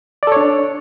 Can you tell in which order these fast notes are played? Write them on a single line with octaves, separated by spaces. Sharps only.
D5 A4 C#5 D4